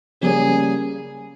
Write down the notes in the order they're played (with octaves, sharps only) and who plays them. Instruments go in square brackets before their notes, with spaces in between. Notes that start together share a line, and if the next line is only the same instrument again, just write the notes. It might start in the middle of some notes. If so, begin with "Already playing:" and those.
[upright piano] C#3 G3 A#3 C#4 [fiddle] G#4